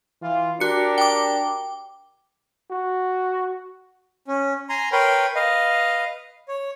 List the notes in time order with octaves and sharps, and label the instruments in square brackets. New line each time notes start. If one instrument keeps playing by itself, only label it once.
[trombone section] E3 F4
[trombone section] D4 G4 A#4 [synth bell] F#4 C#7
[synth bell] G5 D6
[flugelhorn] F#4
[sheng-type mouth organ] C#4
G#5 A#5 C6
A#4 B4 C#5 G5 B5 C6
B4 D#5 F5
C#5